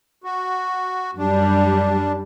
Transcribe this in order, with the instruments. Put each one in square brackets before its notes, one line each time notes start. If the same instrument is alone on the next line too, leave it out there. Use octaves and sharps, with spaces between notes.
[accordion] F#4
[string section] F#2 G3 [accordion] D4